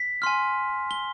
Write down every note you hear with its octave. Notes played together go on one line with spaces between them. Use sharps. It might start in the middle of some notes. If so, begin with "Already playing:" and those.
Already playing: B6
G#5 C6 F6
G7